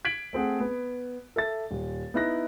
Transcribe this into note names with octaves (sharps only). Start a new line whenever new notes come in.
G#6 B6 D7 F#7
A3 C4 G#4 F#5
B3
A4 E5 A6
D#1
B3 D#4 E4 F#6 A#6